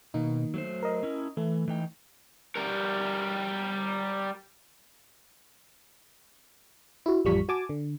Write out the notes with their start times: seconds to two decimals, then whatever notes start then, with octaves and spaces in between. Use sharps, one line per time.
0.14 B2 D#3 A#3 D#4
0.54 F#3 A3 C5
0.83 A#4 D#5
1.03 C#4 E4
1.37 E3 A3
1.68 E3 D#4 G5
2.56 G3 A#4
7.06 E4 F#4
7.25 A1 F2 G3 F4 C#6 B6
7.49 F#4 G#5 A5 D6
7.69 D3